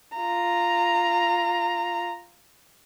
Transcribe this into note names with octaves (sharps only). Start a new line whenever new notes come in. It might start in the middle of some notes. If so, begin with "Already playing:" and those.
F4 A#5